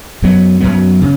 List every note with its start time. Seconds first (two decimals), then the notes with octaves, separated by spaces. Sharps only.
0.22 F#2 F#3 B3
0.60 F#2 F#3 B3
1.01 C#3